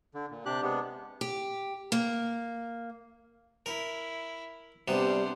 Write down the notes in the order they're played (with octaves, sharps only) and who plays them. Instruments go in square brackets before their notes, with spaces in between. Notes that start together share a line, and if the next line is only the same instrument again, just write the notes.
[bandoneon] D3
A#2
C3 D4 G4 F#6
C3 G#3 B3 D4
[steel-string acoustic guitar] G4
A#3
[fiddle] E4 [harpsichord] A#4
[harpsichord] C3 B3 [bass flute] G3 [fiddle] D4 C5